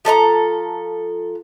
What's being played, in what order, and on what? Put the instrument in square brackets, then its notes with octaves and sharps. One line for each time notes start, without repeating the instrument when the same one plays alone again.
[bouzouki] F3 A4 D#5 A#5